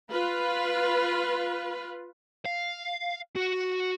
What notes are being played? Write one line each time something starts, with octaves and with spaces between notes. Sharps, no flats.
F4 B4
F5
F#4